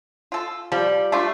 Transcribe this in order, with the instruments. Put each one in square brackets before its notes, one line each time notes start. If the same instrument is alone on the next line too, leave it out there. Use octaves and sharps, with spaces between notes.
[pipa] F4 A4
[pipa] F3 [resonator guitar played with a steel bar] G3
[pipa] A3 D4 F4